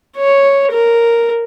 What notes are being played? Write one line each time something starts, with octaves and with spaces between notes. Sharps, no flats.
C#5
A#4